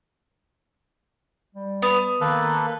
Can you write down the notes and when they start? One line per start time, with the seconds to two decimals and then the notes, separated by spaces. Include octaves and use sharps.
1.55 G3
1.82 B3
2.21 D#3 A#3 A4 B4